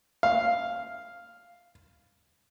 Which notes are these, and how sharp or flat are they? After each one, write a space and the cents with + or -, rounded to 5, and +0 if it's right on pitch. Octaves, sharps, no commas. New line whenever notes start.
F5 +0